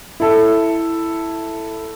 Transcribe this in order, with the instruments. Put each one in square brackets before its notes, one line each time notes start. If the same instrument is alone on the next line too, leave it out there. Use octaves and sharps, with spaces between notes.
[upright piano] E4 A4